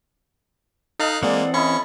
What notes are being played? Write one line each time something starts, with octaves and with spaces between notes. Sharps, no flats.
D#4 A4 D#5 F5 F#6
E3 G#3 A#3 C4 D5 F#5
C#4 E4 D#5 B5 C#6